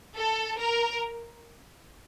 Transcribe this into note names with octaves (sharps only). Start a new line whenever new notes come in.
A4
A#4